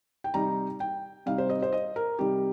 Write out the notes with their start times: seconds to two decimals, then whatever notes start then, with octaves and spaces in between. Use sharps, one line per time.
0.24 G5
0.34 C3 G3 D#4 A#5
0.80 G5
1.26 C3 G3 D#4 F5
1.38 C5
1.50 D#5
1.62 C5
1.72 D#5
1.96 A#4
2.19 C3 G3 D#4 G4